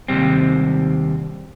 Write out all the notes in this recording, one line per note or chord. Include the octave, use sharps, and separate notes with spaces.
D#2 G#2 C3 G3 C4